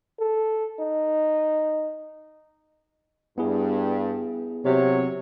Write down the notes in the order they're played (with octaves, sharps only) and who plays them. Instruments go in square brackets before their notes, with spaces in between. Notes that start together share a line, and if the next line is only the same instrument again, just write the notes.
[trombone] A4
D#4
[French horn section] G2 [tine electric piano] B3 E4 G#4
[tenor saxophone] C3 [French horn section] F#3 C#5